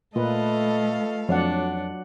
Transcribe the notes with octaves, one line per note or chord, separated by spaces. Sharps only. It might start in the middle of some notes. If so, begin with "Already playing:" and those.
A#2 A3 F4 A4 B4 D#5 F5
F2 F#3 D4 D5 F#5